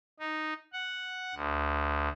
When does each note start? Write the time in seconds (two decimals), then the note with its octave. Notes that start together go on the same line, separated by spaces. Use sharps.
0.20 D#4
0.73 F#5
1.35 D2